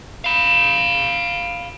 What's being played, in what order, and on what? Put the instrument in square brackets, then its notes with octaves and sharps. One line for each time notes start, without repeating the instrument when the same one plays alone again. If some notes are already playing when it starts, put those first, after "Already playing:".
[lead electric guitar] F5 B5